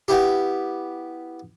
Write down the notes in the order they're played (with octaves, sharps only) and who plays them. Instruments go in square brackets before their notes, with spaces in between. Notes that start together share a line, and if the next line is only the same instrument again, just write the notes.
[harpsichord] B3 E4 G4